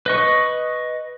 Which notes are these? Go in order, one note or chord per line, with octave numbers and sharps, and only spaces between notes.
B4 D#5 C#6